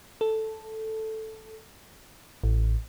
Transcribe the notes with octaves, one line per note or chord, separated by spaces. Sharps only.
A4
A1